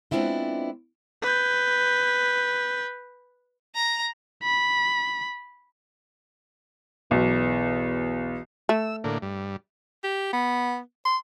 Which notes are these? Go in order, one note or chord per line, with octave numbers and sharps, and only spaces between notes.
G#3 B3 C4 D4 E4 F4
B4 G6
A#5
B5
B1 E2
A3 E6
A2 D3 A#3
G2
G4
B3
C6